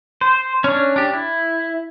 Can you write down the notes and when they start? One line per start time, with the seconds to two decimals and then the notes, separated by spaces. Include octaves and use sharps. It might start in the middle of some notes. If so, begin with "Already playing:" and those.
0.21 C5
0.64 C#4 D4
0.96 D4 G4
1.13 E4